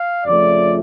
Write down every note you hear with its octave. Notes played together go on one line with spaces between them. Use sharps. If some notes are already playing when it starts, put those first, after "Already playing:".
Already playing: F5
F2 C#3 F3 A3 D5